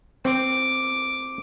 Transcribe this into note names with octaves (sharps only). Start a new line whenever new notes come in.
C4 D6